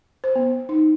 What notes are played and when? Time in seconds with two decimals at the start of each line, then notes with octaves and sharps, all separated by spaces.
0.24 C5
0.36 B3
0.69 D#4